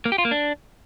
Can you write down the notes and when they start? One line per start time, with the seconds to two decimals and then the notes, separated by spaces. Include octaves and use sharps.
0.05 A#3
0.12 G4
0.18 F4
0.25 A#3
0.31 D4